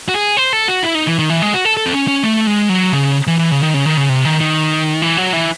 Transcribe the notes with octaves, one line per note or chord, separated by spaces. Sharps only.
F#4
G#4
C5
A4
F#4
E4
D#4
E3
D#3
E3
G#3
F#4
A4
A4
C4
C#4
C#4
A3
G#3
F#3
C#3
E3
E3
C#3
D#3
C#3
D#3
C#3
C3
D#3
D#3
E3
F#3
E3